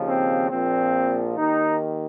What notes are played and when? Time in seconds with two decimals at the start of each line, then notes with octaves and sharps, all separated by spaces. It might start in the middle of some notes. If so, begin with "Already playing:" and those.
Already playing: D#2 C#3 F3
0.08 C4
0.51 A#1 A#2 F3 C4
1.37 D#2 D#3 D#4